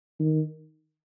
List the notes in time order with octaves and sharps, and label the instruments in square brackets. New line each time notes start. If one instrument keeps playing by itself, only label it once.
[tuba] D#3